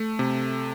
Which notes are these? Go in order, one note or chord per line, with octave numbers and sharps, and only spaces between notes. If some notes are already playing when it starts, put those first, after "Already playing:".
Already playing: A3
C3